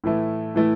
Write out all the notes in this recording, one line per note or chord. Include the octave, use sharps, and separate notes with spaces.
A2 E3 A3 E4
A2 E3 A3 E4